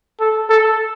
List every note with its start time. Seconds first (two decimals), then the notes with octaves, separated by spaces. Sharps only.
0.20 A4
0.50 A4